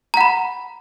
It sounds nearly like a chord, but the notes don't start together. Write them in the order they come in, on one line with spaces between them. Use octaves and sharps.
A#5 F#5 B5